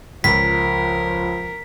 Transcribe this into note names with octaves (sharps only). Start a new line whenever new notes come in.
C#2 F3 A#4 B6